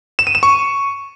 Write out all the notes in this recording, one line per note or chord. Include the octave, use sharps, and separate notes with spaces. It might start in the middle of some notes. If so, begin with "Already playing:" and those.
E7
D#7
E7
C#6